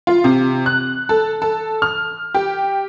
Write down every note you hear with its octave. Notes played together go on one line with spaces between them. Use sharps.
F4
C3
F#6
A4
A4
F6
G4